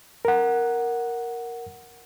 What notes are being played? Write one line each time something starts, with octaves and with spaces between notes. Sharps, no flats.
A#4 F#5